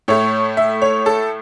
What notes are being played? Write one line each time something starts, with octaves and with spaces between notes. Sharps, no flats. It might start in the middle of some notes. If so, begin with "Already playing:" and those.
A2 A3 C#5
E5
C#5
A4